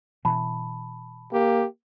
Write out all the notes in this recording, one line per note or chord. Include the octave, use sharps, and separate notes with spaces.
B2 E3 A5 B5
A#3 G4